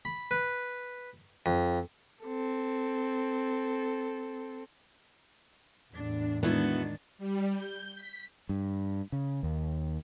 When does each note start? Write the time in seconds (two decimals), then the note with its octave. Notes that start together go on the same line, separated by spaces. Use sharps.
0.05 B5
0.31 B4
1.46 F2
2.23 C4 A4
5.94 E2 A2 D4
6.43 D#3 G#3 B3 D4 E4 F#4
7.18 G3
7.54 G6
7.96 B6
8.49 G2
9.12 C#3
9.43 D#2